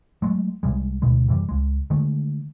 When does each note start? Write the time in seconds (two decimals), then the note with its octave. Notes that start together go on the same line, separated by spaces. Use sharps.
0.22 F#3 G#3 A3
0.63 C2 C3 G3 G#3
1.02 D2 B2 D#3 G#3
1.28 F#2 C3 E3 G3
1.49 C#2 G#3
1.90 D3 D#3 G#3 A3